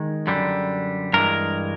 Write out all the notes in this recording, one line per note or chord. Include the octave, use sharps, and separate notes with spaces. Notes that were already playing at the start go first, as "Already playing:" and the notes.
Already playing: D#3 G#3
F#2 D3 G3
G2 E3 G#3 A#4